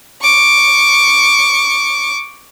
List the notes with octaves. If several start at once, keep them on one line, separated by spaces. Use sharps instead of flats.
C#6 D6